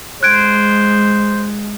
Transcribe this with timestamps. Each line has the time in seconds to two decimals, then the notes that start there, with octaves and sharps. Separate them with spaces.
0.23 G#3 C5 F#6 G#6 D7